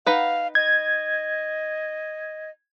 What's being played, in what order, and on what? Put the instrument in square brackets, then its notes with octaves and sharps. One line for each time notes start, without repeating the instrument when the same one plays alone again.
[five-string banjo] D#4 B4 F#5 [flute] F5
[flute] D#5 [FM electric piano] G#6